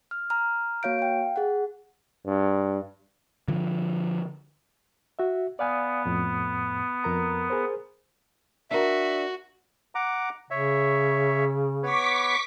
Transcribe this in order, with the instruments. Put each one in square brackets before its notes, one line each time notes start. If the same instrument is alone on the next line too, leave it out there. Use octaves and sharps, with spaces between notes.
[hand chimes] F6
A#5 F6
A#3 F#4 C#5 F5 G6 D7
F5 G5
G#4 F#5
[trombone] G2
[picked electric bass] D3 F3
[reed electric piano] F#4 E5
[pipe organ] B3 [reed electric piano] D5 F5 G#5
[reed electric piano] F2 A2
F2 A#4 A#5
G#4 A#4 C5
[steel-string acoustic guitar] D4 A#4 [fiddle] F#4 [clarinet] E5
[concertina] F#5 A#5 D6
[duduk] C#3 [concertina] C#5 E5
[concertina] B3 B4 C#5 [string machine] C#6 D6 B6